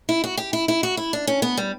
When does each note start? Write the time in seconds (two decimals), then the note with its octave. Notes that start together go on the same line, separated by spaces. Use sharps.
0.09 E4
0.24 F#4
0.37 G4
0.53 E4
0.68 E4
0.83 F#4
0.97 E4
1.13 D4
1.27 C#4
1.42 B3
1.57 G3